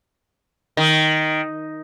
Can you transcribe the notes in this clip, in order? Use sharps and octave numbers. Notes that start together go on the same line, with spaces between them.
D#3